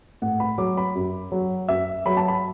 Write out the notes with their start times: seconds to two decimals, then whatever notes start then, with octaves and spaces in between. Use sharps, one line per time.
0.22 A2 F#5
0.40 B5
0.58 F#3 D6
0.77 B5
0.95 F#2
1.32 F#3
1.68 F#2 E5
2.06 F#3 B5
2.17 A5
2.28 B5